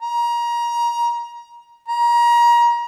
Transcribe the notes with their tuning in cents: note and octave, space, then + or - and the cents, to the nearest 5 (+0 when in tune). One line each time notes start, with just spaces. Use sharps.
A#5 +25
A#5 +30